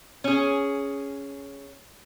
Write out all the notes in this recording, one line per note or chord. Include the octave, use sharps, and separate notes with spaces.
C#4 G#4